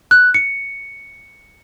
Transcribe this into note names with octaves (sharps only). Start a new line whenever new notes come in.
F#6
C#7